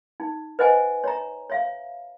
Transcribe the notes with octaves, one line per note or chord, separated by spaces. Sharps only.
D#4
B4 C5 D#5 F#5 G#5
C#5 A#5
C#5 E5 F5